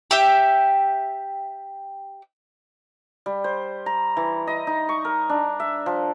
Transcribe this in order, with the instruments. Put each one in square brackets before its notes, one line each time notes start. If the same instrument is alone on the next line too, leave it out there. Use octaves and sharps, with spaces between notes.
[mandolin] G4 E5 G5
[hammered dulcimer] G3
C5
A#5
E3
D#5
D#4
C#6
A#4
D4
E5
F3